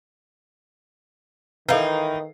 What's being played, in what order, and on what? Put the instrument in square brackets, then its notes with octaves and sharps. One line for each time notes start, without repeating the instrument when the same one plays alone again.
[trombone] D#3 [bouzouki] E3 D#4 [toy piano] A4 B4 [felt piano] E5 F5 C7